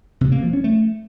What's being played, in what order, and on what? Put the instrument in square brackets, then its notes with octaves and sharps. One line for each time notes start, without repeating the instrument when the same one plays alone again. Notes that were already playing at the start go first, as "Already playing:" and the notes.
[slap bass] C3
A#3
F3
C#4
A3